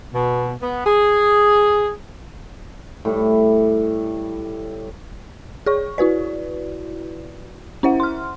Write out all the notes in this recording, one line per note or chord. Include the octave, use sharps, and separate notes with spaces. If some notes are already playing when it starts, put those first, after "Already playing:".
B2
B3
G#4
A2 G3
G#4 C#5 C#6
E4 F#4 B4 D5
C#4 E4 C5 E5 F#5
C6 F6